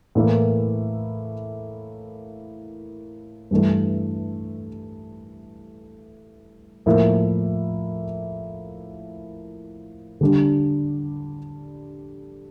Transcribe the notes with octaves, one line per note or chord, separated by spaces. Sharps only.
A2 E3 A#3 E4 A#4
G2 E3 A3
A2 F3 A#3 E4 A#4
D3 G3 D4